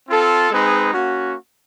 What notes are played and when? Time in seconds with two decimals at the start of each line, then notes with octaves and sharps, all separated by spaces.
0.08 C4 F4 A4
0.50 G#3 C4 D#4 G#4 B4
0.93 A#3 C#4 F#4